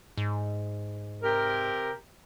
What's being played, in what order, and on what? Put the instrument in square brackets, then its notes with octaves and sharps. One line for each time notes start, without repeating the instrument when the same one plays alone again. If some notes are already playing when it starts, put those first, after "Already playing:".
[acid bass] G#2
[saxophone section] C3 G4 A#4